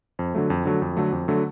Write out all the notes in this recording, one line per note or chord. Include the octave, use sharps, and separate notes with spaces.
F2
D3 F#3 A3
F2
D3 F#3 A3
F2
D3 F#3 A3
F2
D3 F#3 A3